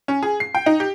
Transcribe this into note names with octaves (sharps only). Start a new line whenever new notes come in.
C#4
G#4
C7
G5
D#4
G4